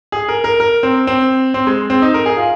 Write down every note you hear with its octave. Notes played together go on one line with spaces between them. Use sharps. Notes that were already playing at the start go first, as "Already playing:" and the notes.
G#4
A#4
A#4
A#4
C4
C4
C4
G#3
C4
D#4
A#4
G#4
F4